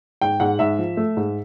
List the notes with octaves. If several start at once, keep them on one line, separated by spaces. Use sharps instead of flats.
G#2 G5
G#2 F#5
G#2 E5
F3
A3
G#2